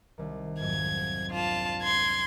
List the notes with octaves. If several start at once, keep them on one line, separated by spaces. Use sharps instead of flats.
C2 D#3
F2 G#2 F#3 G#6
D4 F4 A5
C6 G#6